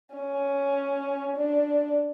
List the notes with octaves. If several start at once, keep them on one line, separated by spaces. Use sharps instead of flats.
C#4
D4